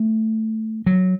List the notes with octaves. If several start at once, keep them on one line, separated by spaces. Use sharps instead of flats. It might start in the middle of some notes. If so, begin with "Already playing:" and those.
Already playing: A3
F#3